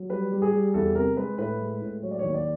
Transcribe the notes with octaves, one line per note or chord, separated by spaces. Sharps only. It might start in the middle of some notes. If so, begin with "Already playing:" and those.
Already playing: F#3
G3 B4
G3
G#4
G3
E2 A4
C3 A#4
G#3 B4
A2 B4
G#3
A2
F#3 C#5
D5
D#2 C#5
D5